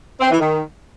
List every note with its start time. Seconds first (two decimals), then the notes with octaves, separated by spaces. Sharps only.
0.20 C4
0.30 E3
0.40 D#3